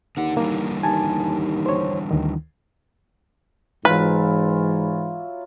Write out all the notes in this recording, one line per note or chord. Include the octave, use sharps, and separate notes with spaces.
D#2 D3 F#5
D3 E3 G3 A#3
D#2 G#5 A5
C5 C#5
D2 D#3
G#2 E3 F#3 E4 F4 B4